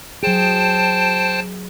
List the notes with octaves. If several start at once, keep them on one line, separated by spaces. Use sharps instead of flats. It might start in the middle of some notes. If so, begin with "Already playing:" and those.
F#3 G#4 C5 G5 A5